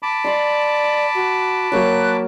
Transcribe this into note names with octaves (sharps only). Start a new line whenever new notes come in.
A5 B5 D6
D5 C6
F#4
F#3 A#3 F#6